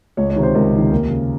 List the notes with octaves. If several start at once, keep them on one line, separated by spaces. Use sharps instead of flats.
C#2 C#5
C#5
C3 D#3
C5
C#2 A#4
C3 D#3
D#2 A#4
C#3